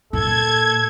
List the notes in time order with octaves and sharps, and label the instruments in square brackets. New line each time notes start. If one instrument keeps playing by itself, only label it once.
[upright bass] A#2 [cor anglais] A4 [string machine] G#6